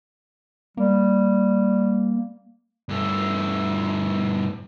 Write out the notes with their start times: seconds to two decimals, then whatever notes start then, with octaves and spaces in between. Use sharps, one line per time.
0.77 G3 A#3
2.89 G2 A3